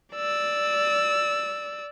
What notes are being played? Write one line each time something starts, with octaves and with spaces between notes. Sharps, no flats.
D5 E6